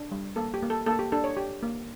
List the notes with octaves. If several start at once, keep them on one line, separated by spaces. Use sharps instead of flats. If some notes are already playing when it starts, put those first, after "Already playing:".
Already playing: D4
G3
A#3 A4
G4
A#3
A4
A#3 A4
G4
D4 A4
C#5
G4
A#3